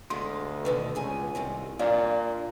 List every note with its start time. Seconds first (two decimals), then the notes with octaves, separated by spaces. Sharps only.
0.10 D2 G#3 F4 C6
0.65 B2 D3 D#3 B4
0.95 C#2 C#3 G#4 G#5
1.35 C2 D3 D#3 C4
1.79 A#2 D4 D5 F5